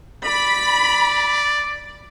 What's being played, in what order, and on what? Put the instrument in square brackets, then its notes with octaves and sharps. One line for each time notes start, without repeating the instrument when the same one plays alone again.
[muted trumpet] D5 [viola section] B5